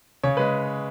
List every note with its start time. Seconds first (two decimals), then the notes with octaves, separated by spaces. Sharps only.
0.23 C#3 C#5
0.37 G#3 B4